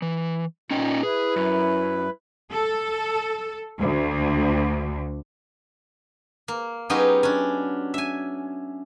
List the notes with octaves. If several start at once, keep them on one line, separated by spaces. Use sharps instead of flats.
E3
A#2 C#4 D#4 G5
E4 G#4 B4
F#2
A4
D2
A#3
F#3 B3 C#4 D#4 G4 G#4
C#4 D4
E5 G#5